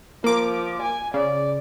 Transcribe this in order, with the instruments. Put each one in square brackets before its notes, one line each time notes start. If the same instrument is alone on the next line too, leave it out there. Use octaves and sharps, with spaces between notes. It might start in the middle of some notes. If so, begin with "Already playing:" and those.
[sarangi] F3 [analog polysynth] A#3 D6
[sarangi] G#5
[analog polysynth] C#3 [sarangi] D5